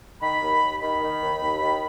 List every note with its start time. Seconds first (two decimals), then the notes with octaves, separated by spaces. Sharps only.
0.21 D#3 B5
0.41 D#2
0.60 D#2
0.81 D#3 B5
1.01 D#3
1.21 D#2
1.41 D#2
1.61 D#3